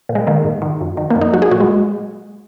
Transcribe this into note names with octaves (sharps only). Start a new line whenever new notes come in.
A#2
G#3
D#3 A#3
G#2
D#3
F#2
D#3
A#3
F#2
D#4
F#3 F#4
G#4
A#2 F#4
G#3